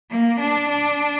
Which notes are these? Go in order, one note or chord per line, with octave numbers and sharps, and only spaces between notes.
A#3
D4
D4